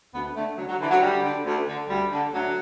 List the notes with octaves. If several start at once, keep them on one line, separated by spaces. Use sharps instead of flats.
D2 B3
D3 A3
D2 F#3
F#3
D3 E3
F#3
D2 G3
D3
D2
D3
D2 G3
D3
D2 F#3